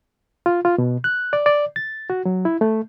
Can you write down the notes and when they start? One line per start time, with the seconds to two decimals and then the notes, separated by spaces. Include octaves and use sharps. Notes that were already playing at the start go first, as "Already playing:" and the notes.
0.46 F4
0.65 F4
0.78 B2
1.04 F#6
1.33 D5
1.46 D5
1.76 A6
2.10 F#4
2.25 F#3
2.45 E4
2.61 A3